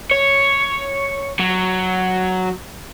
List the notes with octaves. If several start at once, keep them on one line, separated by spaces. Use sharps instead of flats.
C#5
F#3